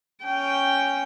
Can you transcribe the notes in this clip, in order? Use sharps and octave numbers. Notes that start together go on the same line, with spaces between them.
C#4 G5